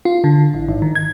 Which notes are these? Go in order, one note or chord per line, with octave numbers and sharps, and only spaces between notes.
F4
D3
A1
G#1
D#3
G#6